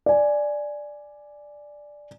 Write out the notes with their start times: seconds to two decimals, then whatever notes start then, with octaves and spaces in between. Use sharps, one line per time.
0.06 D5 G#5